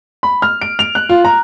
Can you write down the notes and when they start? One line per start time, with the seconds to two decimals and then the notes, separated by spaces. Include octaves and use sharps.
0.23 B5
0.42 F6
0.62 D7
0.79 F7
0.95 F#6
1.09 F4
1.25 A#5